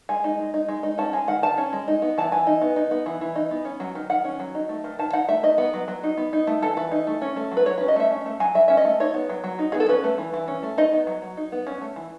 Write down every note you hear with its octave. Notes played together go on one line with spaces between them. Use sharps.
G#3 G#5
D#4
G#3
D#4
G#3
D#4
C#4 A5
G#3 G#5
D#3 F#5
D#3 A5
C#4
G#3
D#4
B3
E3 A5
E3 G#5
D#4
B3
D#4
B3
E3
E3
D#4
B3
C#4
F#3
D#3
D#3 F#5
C#4
F#3
D#4
A3
D#3
D#3 A5
D#4 F#5
A3 E5
D#4 D#5
B3
F#3
F#3
D#4
B3
D#4
A3
E3 A4
E3 B4
D#4
A3
C#4
A3
F#3
B4
F#3 C#5
C#4 B4
D#5
A3 E5
C#4
A3
F#3 G#5
F#3 E5
C#4 E5
D#5
A3
D#4 C#5
B3
F#3
F#3
D#4
B3 G#4
A4
C#4 B4
A3
E3
E3
C#4
A3
D#4 D#5
B3
F#3
F#3
D#4
B3
C#4
A3
E3